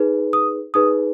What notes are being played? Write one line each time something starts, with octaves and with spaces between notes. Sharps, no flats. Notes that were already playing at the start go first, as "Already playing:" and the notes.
Already playing: D#4 G#4 B4
D#6
D#4 G#4 B4 D#6